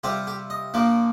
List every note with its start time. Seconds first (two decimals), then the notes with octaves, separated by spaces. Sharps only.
0.04 C3 G3 C4 F4 G4
0.27 G4
0.50 D#5
0.74 A#2 F3 A#3 D4